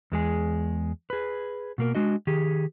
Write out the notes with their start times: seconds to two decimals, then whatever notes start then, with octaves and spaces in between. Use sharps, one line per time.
0.12 E2 G#3 G#4
1.10 G#4 B4
1.78 B2 A#3 A#4
1.95 G#3 D4 F#4 D#5
2.27 D#3 G4 G#4